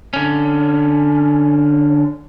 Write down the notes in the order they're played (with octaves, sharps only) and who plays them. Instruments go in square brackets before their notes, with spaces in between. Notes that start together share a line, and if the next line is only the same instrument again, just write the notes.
[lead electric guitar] D3 C#4